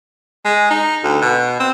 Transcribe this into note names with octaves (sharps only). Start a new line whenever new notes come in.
G#3
D#4
D2
B2
C4